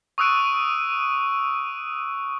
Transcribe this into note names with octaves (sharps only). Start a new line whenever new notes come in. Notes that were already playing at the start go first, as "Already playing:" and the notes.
C#6 D#6 E6 F#6 D7 D#7